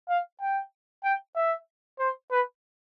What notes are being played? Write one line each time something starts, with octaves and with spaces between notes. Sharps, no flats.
F5
G5
G5
E5
C5
B4